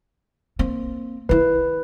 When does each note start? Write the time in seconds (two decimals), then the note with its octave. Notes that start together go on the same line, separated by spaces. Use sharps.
0.59 A#3 C4
1.29 D#3 E4 B4